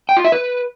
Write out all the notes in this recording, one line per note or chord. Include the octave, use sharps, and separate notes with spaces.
G5
F4
E5
B4